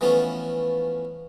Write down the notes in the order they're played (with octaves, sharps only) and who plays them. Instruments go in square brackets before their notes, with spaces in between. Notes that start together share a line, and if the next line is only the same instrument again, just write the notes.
[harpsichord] E3 F3 A3 B3 C#4 F4